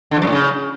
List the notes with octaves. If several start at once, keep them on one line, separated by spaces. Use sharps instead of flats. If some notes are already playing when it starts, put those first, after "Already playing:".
D3
E2
F#2
A2
C#3